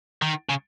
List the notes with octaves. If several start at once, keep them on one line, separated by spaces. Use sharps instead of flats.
D#3
C#3